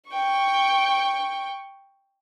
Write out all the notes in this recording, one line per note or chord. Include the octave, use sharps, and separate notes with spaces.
G5 C#6